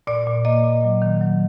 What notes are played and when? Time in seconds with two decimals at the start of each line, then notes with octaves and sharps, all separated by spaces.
0.07 A#2 D5
0.27 A#2
0.45 A#3 D#5
0.64 A#2
0.84 F#3
1.02 D#3
1.21 F#3